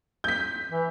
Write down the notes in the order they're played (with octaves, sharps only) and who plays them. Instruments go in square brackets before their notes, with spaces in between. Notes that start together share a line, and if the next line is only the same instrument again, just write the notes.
[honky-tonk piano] G6 B6
[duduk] E3